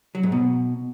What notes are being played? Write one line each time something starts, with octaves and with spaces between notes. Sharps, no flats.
F#3
G#2
B2